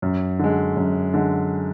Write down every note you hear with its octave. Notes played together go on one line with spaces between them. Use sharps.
F#2
D3 G#3
F#2
D3 G#3